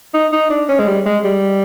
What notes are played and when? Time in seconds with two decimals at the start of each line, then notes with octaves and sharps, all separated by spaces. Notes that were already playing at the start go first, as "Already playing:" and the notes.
0.14 D#4
0.32 D#4
0.50 D4
0.68 C#4
0.79 G#3
0.88 G3
1.06 G#3
1.24 G3